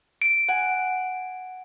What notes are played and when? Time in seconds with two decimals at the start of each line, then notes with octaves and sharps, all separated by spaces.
0.22 D7
0.48 F#5 G#5